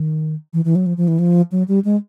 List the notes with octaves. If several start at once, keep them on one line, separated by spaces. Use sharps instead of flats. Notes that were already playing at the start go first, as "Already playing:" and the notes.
Already playing: D#3
E3
E3
F#3
F3
F3
E3
F3
F#3
G3
G#3